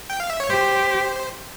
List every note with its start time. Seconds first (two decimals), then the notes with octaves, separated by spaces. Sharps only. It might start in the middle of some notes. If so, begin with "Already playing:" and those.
0.10 G5
0.20 F5
0.30 E5
0.40 C#5
0.50 G4 C5